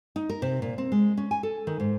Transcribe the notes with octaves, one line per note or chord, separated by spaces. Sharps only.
D#4
A#4
C3
A#2
C4
G#3
C#4
G#5
A4
D#3
G#2